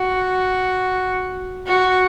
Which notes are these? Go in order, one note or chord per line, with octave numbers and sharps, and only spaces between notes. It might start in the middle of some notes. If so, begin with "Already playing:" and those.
Already playing: F#4
F#4